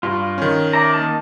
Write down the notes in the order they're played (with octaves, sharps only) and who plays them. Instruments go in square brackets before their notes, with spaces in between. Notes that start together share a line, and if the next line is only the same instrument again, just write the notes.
[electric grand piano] G2 [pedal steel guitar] F4
[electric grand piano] D#3 C#4
[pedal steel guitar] D5 E5 A#5
A#3 D#4 A5